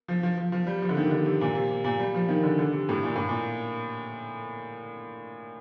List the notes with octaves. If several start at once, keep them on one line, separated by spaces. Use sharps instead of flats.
F3
F3
F3
F3
G3
F3
D3
D#3
C3
D3
C3
A#2
C3
C3
A#2
G3
F3
D#3
D3
D3
C3
A2
A#2
A2
A#2